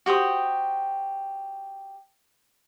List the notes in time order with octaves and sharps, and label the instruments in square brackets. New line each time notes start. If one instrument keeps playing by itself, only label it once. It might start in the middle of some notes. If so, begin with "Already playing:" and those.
[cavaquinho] F#4 G4 C5 D#6